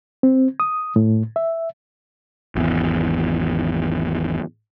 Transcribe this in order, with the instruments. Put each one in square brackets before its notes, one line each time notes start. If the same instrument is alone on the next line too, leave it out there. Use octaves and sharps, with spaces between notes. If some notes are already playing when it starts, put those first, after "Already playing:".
[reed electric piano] C4
D#6
A2
E5
[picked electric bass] G#1 E2